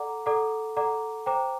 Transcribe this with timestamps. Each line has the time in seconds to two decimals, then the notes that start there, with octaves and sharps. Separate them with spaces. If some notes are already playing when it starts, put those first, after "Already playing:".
Already playing: A4 D5 F#5 A#5 D6
0.26 A4 D5 F#5 A#5 D6
0.76 A4 D5 F#5 A#5 D6
1.26 C5 G5 A#5 D6